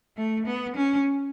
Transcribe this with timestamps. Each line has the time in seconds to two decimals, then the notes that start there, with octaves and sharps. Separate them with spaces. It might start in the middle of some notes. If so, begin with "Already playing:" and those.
0.17 A3
0.46 B3
0.76 C#4